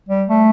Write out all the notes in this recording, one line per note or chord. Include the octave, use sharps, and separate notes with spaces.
G3
A3